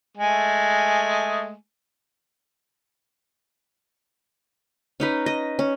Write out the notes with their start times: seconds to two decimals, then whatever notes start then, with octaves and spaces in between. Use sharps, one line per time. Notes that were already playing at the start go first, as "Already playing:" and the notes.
0.18 G#3 A3 G#5
5.00 C#4 D#4 B4
5.26 D#5
5.59 C#4